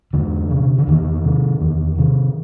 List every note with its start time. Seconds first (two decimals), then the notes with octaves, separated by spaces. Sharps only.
0.13 E2 D3
0.50 C3
0.78 D3
0.88 E2 D#3
1.24 C3
1.61 E2
1.99 C3